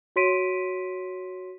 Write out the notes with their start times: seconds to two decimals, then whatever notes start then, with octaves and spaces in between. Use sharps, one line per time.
0.16 F#4 C#5 C6 B6 D7 D#7